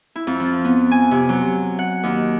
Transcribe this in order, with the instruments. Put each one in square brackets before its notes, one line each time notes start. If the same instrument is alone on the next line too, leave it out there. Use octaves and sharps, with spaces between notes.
[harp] E4
F2
F3
B3
G#5
C3
F#3
F#5
D#2